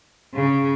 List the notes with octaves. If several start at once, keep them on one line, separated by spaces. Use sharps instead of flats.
C#3